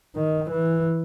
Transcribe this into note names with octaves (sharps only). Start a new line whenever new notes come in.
D#3
E3